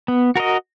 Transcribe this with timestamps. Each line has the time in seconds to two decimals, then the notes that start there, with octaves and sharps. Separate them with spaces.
0.08 B3
0.36 F#4 A#4 D#5